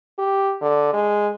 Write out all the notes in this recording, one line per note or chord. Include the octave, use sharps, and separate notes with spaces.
G4
D3
G#3